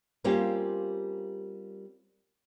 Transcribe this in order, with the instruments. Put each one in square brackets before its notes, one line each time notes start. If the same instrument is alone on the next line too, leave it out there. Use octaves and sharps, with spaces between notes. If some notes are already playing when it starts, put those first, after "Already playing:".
[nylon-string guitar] G3 A#3 C4 C#4 F4 G4